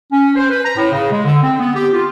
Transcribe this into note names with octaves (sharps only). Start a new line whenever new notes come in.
C#4
C5
B4
A#5
A2
C#3
G#3
D3
C4
B3
G4
F4